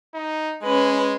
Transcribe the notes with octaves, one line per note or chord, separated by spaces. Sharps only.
D#4
G#3 C#4 B4